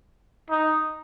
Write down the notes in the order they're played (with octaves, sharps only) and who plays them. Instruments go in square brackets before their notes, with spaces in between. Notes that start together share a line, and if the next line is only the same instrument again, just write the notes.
[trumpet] D#4